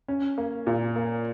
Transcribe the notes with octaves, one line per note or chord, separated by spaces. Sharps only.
C#4
A#3
A#2
A#3